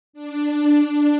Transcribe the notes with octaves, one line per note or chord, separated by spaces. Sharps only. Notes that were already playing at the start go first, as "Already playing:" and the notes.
D4